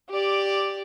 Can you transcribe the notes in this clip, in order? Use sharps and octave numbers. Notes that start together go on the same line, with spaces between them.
G4 D5